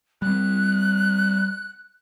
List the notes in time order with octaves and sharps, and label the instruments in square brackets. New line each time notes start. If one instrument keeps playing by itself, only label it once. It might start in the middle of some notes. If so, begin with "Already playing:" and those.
[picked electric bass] G3 C4 [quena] F#6